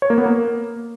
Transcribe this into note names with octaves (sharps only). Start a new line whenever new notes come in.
C#5
A#3
B3
A#3